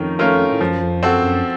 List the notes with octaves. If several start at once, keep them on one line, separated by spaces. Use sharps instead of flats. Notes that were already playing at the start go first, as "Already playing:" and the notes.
Already playing: F2 D#3 A3 C#4 F4 A#4
A3 C#4 F4 A#4
A2
F#2 F3
F2
F#2 C4 F#4 A4
F#2